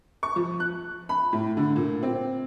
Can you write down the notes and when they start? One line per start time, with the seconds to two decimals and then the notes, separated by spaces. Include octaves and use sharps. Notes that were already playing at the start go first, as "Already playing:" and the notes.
0.23 C#6
0.36 F3
0.60 F#6
1.09 B5
1.33 A2
1.57 D3
1.76 A#2
2.03 C4